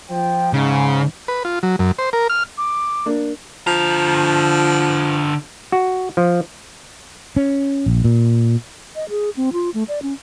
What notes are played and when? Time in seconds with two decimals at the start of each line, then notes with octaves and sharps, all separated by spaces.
0.10 F3 G5
0.53 G#2 C#3
1.28 B4
1.45 F4
1.63 F#3
1.79 F#2
1.99 C5
2.13 A#4
2.30 F6
2.58 D6
3.06 A#3 D4
3.67 D3 F3 A#5
5.72 F#4
6.17 F3
7.36 C#4
7.86 A#1
8.04 A#2
8.96 D#5
9.09 G#4
9.37 C4
9.53 F4
9.74 A3
9.88 D5
10.02 C#4